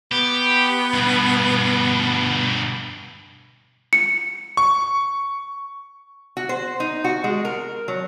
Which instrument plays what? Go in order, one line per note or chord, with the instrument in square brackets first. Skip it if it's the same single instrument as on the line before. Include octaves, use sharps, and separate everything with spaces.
[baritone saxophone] B3 [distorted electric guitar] G4
[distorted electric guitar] G2 B2
[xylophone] C#7
[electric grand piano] C#6
[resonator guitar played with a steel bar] F#4
C5
D#4
F#4
G#3
A#4
F#3